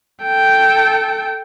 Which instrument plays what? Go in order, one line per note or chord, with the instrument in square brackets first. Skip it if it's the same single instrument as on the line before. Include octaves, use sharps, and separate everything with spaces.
[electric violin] A4 G5